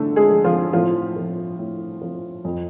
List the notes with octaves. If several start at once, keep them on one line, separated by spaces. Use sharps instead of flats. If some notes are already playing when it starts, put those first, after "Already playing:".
Already playing: A2 D3 F3 A3 D4 A4
G#3 G#4
F3
F3 F4
A2 F3 F4
F3
A2
F3
F2